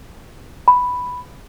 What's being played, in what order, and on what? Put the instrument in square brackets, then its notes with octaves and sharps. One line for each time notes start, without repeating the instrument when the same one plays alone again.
[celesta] B5